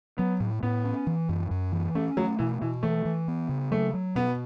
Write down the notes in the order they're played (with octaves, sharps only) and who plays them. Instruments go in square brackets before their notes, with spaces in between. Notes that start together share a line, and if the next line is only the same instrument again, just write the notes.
[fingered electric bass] F#3 [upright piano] B3
[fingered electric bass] A2
[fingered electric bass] A2 [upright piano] B3
[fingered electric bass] C#4
E3
F#2
F#2
E3
[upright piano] A3 [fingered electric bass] C#4
[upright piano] F#3 [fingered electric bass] A3
[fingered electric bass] B2 [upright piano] E3
[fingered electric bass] B2 [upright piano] E3
[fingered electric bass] E3 [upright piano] A3
[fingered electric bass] E3
B3
C#3
[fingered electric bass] F#3 [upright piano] A3
[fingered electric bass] F#3
[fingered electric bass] B2 [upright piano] B3